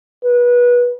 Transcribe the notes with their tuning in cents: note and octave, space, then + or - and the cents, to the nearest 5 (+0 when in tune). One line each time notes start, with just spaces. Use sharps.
B4 -25